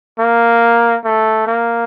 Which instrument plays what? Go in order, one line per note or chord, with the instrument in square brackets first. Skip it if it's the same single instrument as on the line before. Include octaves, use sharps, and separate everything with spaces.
[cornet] A#3
A3
A#3